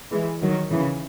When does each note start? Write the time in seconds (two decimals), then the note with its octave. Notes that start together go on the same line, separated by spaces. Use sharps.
0.11 E3 G#3
0.42 D#3 F#3
0.71 C#3 E3